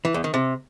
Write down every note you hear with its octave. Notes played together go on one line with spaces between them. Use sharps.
E3
E2
D#3
C3